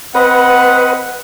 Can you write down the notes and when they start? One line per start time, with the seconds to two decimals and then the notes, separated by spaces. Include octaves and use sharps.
0.15 C4 B4 D#5 F#5